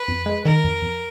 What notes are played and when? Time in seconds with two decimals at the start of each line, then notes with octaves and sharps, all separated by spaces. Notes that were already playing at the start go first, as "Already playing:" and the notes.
Already playing: B4
0.08 F2
0.26 G#3
0.45 D#3 A#4
0.64 F2
0.82 F2